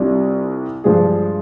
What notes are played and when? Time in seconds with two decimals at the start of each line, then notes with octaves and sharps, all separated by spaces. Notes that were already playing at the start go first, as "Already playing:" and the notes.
Already playing: C2 C3 G3 D4 F4
0.84 G2 F3 G#3 D4 G#4